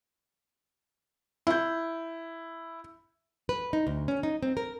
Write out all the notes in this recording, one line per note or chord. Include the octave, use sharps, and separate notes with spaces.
E4 G6
B4
D#4
D2
C#4
D#4
C4
A#4